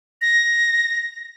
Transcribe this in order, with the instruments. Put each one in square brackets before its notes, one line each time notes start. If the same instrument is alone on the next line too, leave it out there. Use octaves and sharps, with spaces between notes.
[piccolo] A#6